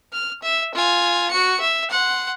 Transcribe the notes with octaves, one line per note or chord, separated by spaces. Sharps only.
F6
E5
F4 G#5
F#4 C#7
E5
F#5 C6